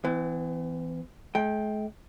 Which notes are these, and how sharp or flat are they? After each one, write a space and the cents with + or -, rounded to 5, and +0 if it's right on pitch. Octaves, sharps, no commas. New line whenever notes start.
E3 +0 B3 +45
G#3 +45 G5 +0